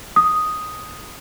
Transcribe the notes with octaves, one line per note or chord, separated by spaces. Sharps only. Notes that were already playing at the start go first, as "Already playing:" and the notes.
D#6